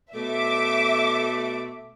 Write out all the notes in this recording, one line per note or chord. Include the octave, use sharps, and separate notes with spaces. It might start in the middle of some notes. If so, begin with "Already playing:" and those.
B2 A3 E5 D6